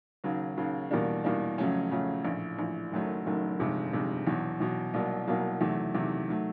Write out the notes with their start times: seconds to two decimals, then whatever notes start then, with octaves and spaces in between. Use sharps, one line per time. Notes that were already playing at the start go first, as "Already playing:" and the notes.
0.24 D#2 C#3 F#3
0.57 D#2 C#3 F#3
0.91 E2 B2 G3 A#3 D4
1.24 E2 B2 G3 A#3 D4
1.58 F2 C#3 F#3 A3 C#4
1.91 F2 C#3 F#3 A3 C#4
2.25 A#1 A2 E3
2.59 A#1 A2 E3
2.92 F#1 F#2 D#3 F#3 A3
3.26 F#1 F#2 D#3 F#3 A3
3.59 G1 F2 C3 D#3 G#3
3.93 G1 F2 C3 D#3 G#3
4.26 E2 B2 F#3
4.60 E2 B2 F#3
4.94 C2 B2 F#3 A#3
5.28 C2 B2 F#3 A#3
5.61 E2 C3 D#3 F#3 A3
5.94 E2 C3 D#3 F#3 A3
6.29 D#3 F#3 A3